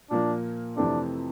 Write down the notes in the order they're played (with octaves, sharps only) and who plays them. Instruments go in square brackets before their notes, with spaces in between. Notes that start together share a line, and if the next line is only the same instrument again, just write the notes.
[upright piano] A#2 F3 A#3 [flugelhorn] D4
[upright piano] F2 C3 E3 A3 C4 [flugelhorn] D4